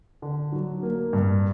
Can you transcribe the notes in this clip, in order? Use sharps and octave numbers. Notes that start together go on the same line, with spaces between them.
D3
F#3
A#3
G2